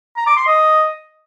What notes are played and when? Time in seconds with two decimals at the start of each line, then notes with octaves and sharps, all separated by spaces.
0.17 A#5
0.27 D6
0.37 C6
0.47 D#5